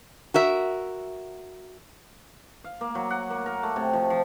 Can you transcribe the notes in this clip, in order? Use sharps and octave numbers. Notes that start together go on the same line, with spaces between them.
F#4 A#4 E5
F5
A#3
F#3
F#5
A#3
A#4
A3
C3
F3
F3